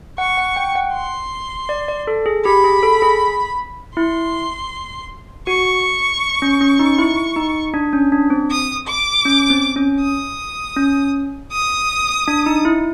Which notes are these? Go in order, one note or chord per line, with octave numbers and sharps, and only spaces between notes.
F#5 C#6
F#5
G5
F#5
C6
D5
D5
A4
G#4
G4 B5
G#4
A4
G#4
E4 C6
F#4 C#6
C#4
C#4
D#4
E4
D#4
D4
C#4
D4
C4
D#6
D6
C#4
C4
C#4
D#6
C#4
D#6
D4
D#4
E4